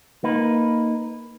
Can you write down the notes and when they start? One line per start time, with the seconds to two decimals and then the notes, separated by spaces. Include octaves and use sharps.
0.24 A#3 D#4 B4